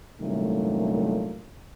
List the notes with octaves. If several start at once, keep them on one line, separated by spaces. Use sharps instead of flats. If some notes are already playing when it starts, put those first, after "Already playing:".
C2 G2 A#2 D#3 F#3 A3